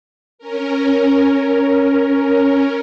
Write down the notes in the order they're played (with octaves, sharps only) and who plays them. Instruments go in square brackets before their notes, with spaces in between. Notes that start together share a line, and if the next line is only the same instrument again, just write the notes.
[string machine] C#4 A#4